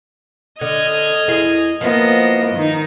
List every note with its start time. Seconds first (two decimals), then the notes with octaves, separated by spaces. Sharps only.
0.61 D3 D#5 F6 G#6
1.28 E2 E4 G#4
1.81 F3 A#3 B3 E4 F4 D#5
2.55 D#3 D#4